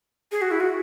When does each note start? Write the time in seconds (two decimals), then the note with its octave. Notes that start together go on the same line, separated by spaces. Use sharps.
0.32 G#4
0.42 F#4
0.51 E4
0.60 F#4